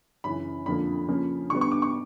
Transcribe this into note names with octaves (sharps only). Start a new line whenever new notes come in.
F#2 C#3 E3 B5
F2 D3 F3 A#3 B5
C#3 F3 A#3 C#4
D3 G3 B3 C#6
C#6
D6
C#6